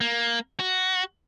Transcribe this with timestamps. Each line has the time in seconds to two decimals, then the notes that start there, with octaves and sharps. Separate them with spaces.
0.01 A#3
0.60 F#4